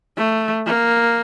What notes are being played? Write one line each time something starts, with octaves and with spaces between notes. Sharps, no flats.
A3
A#3